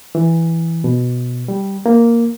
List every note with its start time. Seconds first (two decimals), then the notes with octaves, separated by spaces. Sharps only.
0.15 E3
0.84 B2
1.48 G3
1.86 A#3